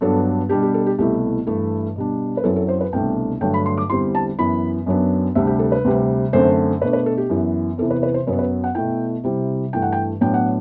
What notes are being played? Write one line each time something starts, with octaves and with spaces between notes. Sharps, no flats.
G2 F#3 B3 D4 A4
B2 G3 D4 G4
G4
A4
G4
C2 B2 A3 E4 G4
G2 E3 A3 E4 A4
B2 G3 D4
B4
F#2 F#3 C4 E4 A4
A4
C5
B4
C2 B2 A3 D4 G5
G2 D3 F#3 A3 G5
B5
C6
D6
E2 D3 G3 C4 E4 C6
A5
F#2 E3 B3 B5
F#2 F#3 B3 D4
D2 C3 G3 D4 E5
G4
A4
B4
D2 C3 G3
F#2 D3 A3 C4 C5
B2 A3 D4 B4
B4
A4
G4
F#2 E3 B3
E2 C3 E3 A4
B4
B4
C5
F#2 F#3 B3 B4
B4
F#5
B2 A3 E4 G5
C3 G3 C4 E4
G2 E3 A3 G5
F#5
G5
A2 F#3 B3 D4 G5
F#5